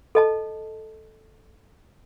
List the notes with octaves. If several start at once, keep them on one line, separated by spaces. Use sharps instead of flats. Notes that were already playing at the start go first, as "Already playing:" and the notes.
A4 D#5 A5